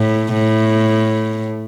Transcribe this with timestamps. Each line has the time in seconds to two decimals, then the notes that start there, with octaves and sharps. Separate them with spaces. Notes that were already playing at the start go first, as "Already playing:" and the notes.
Already playing: A2
0.34 A2